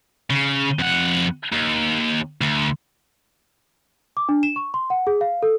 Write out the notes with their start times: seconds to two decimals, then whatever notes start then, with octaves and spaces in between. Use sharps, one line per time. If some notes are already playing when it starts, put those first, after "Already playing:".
0.30 C#3
0.79 F2 F#5
1.52 D#2
2.41 D2
4.17 D6
4.29 D4
4.43 E7
4.56 C#6
4.74 C6
4.90 F#5
5.07 G#4
5.21 F5
5.43 A4